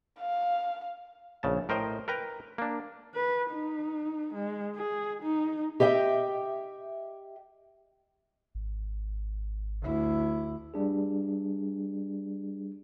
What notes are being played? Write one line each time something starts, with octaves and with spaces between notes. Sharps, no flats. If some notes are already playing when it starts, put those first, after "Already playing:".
F5
A#1 C#3 A5
A2 A#4 C5 D#5 G5
A#4 B4 G5 A#5
A#3 D4
B4
D#4
G#3
G#4
D#4
G4 D#5 E5 G5
G#1
D2 E4
G3 D4 G#4